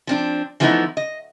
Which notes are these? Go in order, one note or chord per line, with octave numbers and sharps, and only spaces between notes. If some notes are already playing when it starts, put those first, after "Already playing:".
F3 C4 D4
E3 F3 A3 B3 D#4 E4
D#5